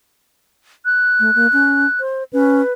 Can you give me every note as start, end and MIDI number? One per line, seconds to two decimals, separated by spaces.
0.85 2.00 90
1.20 1.31 57
1.35 1.47 58
1.53 1.86 61
2.00 2.23 72
2.33 2.62 61
2.33 2.73 71